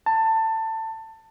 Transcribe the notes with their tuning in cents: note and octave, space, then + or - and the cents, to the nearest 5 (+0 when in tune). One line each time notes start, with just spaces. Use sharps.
A5 +20